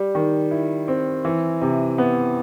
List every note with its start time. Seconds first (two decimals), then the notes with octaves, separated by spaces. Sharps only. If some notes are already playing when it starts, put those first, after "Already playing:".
Already playing: G3
0.15 D#3
0.51 E4
0.88 C4
1.25 E3
1.61 C3
1.98 B3